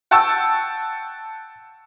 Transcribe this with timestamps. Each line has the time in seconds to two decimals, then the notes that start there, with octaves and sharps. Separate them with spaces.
0.11 F#5 G5 A5 C#6 E6